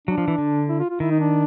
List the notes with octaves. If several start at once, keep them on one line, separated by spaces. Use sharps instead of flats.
F#3 D4
F3
E3
D3
E4
F4
F4
D#3 E4
D#4
D4